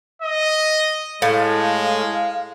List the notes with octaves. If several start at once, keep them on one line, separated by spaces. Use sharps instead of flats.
D#5
A2 G#3 F5